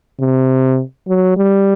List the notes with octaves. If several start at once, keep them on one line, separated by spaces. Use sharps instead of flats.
C3
F#3
G3